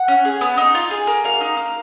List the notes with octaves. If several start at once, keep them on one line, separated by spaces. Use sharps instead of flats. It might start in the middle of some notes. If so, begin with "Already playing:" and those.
Already playing: F#5
C#4
G#4
B3
D#4
F4
G#4
A#3
F#4 F5
D#4
A#3